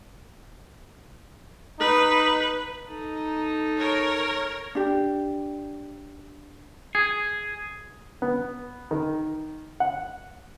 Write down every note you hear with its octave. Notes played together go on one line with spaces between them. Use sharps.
D#4 B4
D#4 A4
A#4 C#5
D4 G4
G#4
B3
D#3
F#5